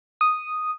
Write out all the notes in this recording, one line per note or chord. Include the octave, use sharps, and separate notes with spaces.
D#6